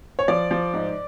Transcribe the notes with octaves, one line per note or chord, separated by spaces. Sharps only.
C#5
F3 D5
F3
G#2